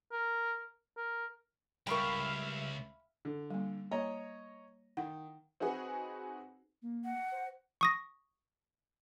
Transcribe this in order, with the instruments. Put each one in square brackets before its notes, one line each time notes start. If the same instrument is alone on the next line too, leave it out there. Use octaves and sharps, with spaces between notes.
[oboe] A#4
A#4
[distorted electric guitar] C#2 [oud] G3 A#4 [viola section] E5 F5 [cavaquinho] G5 B5 C#6
[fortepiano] D3
[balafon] G3 A#3
[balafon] A#3 [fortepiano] C#5 D#5 A#5
[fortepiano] D#3 [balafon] F#5
[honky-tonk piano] C4 D#4 F#4 G#4 B4 F#5
[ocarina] A#3
[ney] F#5
[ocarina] C5
[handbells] C#6 D#6 A#6